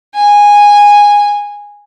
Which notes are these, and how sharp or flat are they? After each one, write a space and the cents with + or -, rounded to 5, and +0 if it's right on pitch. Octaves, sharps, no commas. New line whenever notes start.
G#5 -10